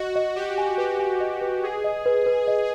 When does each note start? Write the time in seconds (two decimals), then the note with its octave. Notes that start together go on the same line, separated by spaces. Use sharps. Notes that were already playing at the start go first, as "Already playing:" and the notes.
Already playing: F#4 D#5
0.16 D#5
0.36 G4 D#5
0.58 G#5
0.78 G4 B4
0.99 G#5
1.20 D#5
1.41 B4
1.62 G#4 B4
1.84 D#5
2.06 B4
2.26 B4
2.48 D#5